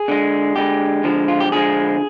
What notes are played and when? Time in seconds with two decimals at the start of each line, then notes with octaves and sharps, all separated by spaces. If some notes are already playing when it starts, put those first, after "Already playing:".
Already playing: G#4
0.08 D3 G#3
0.56 D3 G#3 G4
1.04 D3 F3 G#3
1.28 F4
1.40 G4
1.52 D3 F3 G#3 G#4